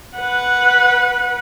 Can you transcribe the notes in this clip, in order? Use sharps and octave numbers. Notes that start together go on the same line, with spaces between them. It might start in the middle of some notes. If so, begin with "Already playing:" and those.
B4 F#5